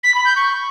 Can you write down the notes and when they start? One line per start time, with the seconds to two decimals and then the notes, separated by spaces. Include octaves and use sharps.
0.04 B6
0.14 B5
0.25 G6
0.36 C#6